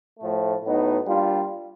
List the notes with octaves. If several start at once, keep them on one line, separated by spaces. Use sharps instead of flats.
A2 F3 A3
A2 F#3 B3 D#4 F#4
G3 A#3 D4 F4